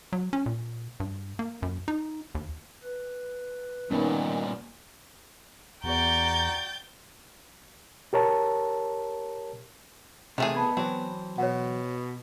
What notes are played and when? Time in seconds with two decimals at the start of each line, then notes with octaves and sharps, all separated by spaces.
0.13 F#3
0.33 C#4
0.46 A#2
1.00 G2
1.39 A#3
1.62 F#2
1.88 D#4
2.35 D#2
2.83 B4
3.91 G2 A#2 D#3 B3 C#4
5.84 E2 F#4 D5 G5 A#5 G6 A6
8.13 G4 A#4 C#5 A5
10.38 C3 D#3 E3 A3 G#4
10.55 B3 A5 B5 G#6
10.77 E3 F#3 C4
11.38 B2 C#5 F#5